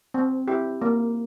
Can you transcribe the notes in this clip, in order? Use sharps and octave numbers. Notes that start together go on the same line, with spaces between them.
C4
E4 G4
A#3